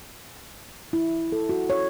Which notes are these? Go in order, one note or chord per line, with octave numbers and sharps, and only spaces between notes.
E4
A4
F#4
C#5